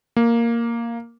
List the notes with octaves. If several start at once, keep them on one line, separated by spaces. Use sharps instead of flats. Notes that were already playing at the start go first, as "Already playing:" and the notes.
A#3